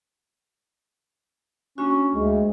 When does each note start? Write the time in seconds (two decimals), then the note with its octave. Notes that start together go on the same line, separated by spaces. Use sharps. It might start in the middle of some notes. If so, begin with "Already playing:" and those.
1.78 A#3 C#4 D4 F#4
2.15 D2 G#3